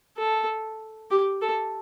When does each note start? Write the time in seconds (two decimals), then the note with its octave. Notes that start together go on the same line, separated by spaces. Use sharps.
0.18 A4
1.11 G4
1.42 A4